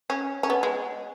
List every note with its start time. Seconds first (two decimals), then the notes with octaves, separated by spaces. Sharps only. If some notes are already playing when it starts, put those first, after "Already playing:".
0.10 C#4
0.43 C#4
0.50 B3
0.63 G#3